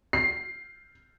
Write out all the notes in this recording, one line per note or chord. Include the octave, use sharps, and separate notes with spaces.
C7